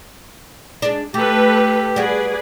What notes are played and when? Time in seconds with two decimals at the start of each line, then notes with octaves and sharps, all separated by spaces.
0.82 G#3 D4
1.14 A3 G4 A4 B4
1.96 G3 F#4 G#4 B4 D5